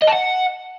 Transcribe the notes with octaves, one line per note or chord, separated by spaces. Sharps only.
D#5
A5
F#5